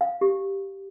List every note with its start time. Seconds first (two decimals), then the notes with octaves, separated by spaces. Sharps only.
0.01 F5
0.21 G4